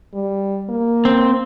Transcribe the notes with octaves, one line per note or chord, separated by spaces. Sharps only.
G3
A#3
C4